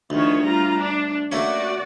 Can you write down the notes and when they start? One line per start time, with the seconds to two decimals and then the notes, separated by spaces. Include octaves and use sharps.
0.10 D2 D#3 F3 C#5
0.42 G3 F4 A#5
0.77 D4
1.32 A3 A#3 C#4 F#4 D5